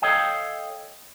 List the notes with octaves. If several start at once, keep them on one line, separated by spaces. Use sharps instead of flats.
A4 C#5 D#5 F5 G5